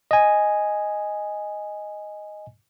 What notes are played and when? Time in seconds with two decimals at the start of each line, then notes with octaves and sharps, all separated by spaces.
0.11 D#5 G#5